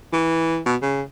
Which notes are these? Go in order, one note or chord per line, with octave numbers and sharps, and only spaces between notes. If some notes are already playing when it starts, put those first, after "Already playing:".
E3
B2
C#3